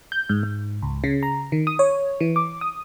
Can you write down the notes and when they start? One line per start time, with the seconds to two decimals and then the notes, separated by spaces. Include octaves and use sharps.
0.12 G6
0.29 G#2
0.43 G#2
0.83 C#2
1.04 C#3
1.23 A#5
1.52 D#3
1.67 D#6
1.79 C#5
2.20 E3
2.36 D6
2.61 D#6